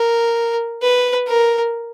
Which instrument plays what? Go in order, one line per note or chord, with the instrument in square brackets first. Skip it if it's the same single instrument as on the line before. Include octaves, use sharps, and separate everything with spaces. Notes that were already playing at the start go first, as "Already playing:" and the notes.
Already playing: [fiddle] A#4
B4
A#4